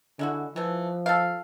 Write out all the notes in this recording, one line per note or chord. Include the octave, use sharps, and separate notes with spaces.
D3 G#3 E4 F#4
E3 F3 A3
A4 F5